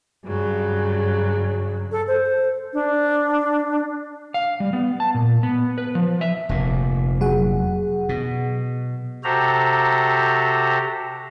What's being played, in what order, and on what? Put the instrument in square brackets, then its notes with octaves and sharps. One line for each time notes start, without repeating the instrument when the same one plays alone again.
[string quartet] G2 C#3 F#3
[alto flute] A4
C5
D4
[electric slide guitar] F5
G3
B3
A5
A#2
B3
B4
F3
E5
[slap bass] F1 A#2
[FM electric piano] F#3 G#4 F#5
[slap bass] B2
[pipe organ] C3 F#4 G4 A4 C5 A#5